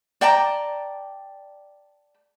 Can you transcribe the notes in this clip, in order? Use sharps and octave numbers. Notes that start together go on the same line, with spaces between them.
D5 G5 A5 A#5